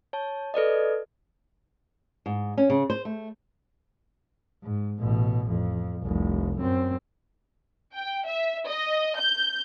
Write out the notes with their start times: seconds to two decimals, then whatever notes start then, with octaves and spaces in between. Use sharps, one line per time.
0.13 C#5 A5
0.54 A4 B4 D5 D#5
2.26 G#2
2.57 C#4
2.70 C#3
2.90 C5
3.05 A3
4.63 G#2
5.00 A1 B2
5.49 F2
6.02 F1 C2
6.59 F#2 C4
7.94 G5
8.27 E5
8.68 D#5
9.19 G6